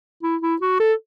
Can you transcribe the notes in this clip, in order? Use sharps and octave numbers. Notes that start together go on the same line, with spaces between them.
E4
E4
F#4
A4